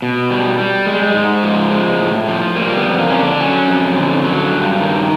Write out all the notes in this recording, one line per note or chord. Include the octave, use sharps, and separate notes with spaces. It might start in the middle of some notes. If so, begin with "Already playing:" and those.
B2
G3
G3
G#3
G#2
F3
G#3
A2
F3
G3 A#3
B3
F2
A#3
D3 C#4
D4
F#3 C#4
F2
D3
F#3
G2
D#3